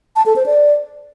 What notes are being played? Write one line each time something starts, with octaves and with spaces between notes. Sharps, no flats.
A5
A4
C5
D5